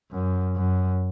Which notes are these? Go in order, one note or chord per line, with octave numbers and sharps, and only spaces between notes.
F#2
F#2